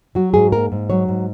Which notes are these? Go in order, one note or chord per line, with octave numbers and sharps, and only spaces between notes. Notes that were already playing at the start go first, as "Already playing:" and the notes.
F#3 F#4
G#2 G#4
A#3 A#4
G#2
F#3 C#5
G#2